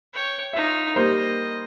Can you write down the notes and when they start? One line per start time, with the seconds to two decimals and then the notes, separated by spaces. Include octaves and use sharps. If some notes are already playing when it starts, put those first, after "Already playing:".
0.14 C#5 G5
0.53 D#4 F4 E5
0.96 G3 A#3 C5 D#5